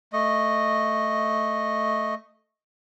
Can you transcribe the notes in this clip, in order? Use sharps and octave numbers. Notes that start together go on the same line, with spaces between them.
A3 D#5